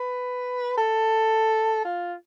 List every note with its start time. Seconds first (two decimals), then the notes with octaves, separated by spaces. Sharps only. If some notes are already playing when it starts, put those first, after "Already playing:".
Already playing: B4
0.78 A4
1.85 F4